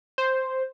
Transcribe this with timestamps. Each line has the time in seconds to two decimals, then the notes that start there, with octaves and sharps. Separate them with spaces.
0.18 C5